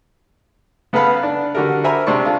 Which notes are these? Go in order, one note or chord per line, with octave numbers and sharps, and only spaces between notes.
C#3 B3 A4 B4 F5 B5
D4
D3 F#4 G4 A4 A#4
A#4 C5 E5 G#5 A#5 B5
C3 G#3 C4 D4 C#6
D4 F4 A4